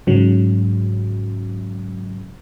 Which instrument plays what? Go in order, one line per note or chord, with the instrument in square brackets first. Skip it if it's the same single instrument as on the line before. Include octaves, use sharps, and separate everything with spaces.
[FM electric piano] G#2 C#3 F#3